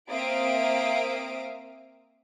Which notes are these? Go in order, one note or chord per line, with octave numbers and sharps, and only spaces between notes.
A#3 C4 E5 F5 D#6 D7